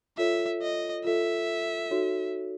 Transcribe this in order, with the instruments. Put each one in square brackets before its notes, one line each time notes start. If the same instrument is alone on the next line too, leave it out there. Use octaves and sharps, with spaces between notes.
[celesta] F4 A4 C#5 [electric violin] E5
[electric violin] D#5
[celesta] F4 A4 C#5 [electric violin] E5
[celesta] D#4 F#4 A4 C#5